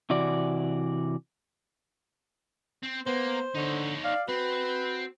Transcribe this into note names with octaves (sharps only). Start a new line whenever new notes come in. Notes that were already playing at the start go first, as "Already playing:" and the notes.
C3 E3 F#4 D5
C4
A#3 B3 C5
D3 D#4 C#5
D5 F5
C4 F#4 B4